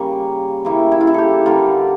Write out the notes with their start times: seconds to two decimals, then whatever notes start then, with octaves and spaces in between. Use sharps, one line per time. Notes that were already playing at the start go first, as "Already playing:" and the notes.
Already playing: C#3 G3 A#3
0.65 C#3 G3 A#3 E4
0.92 E4
1.01 F4
1.07 E4
1.14 G4 A4
1.46 D3 G3 A#3 F4